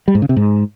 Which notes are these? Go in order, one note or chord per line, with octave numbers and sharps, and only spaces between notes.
G3
G#2
C#3
C3
G#2